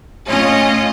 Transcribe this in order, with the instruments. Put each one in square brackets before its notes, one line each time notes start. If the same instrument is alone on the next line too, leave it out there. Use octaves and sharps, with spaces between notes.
[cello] A2 [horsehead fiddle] C#4 [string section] F4 D#5